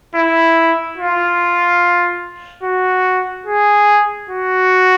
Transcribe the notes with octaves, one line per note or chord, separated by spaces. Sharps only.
E4
F4
F#4
G#4
F#4